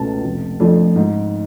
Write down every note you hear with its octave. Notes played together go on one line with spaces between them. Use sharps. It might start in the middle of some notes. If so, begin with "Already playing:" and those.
Already playing: C#2 B2 A3 C#4 A5
F1
F2 F3 A3 D4
G#2